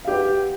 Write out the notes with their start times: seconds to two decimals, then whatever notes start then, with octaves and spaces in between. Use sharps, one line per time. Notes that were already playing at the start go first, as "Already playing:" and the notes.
0.05 F5
0.08 G4
0.10 B4
0.13 F#5